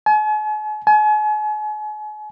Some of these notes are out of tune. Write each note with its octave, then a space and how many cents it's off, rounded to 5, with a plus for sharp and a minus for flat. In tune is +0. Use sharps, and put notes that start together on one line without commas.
G#5 +45
G#5 +40